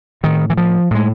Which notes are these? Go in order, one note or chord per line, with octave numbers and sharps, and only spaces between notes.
A2 D#3
E3
F3
A2 G#3